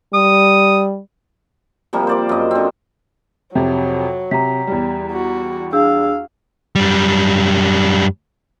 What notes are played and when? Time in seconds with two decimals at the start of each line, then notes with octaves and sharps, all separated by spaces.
0.14 G3 D#6
1.93 C3 F3 G3 A#3
2.07 C5 D5 D6
2.29 F#2 D#5
2.51 D3 C4
3.55 F2 C3 F#3
4.31 C3 A#5 B6
4.67 E2 G3
5.12 F#4
5.73 D4 G#4 F5 E6
6.75 F#2 G3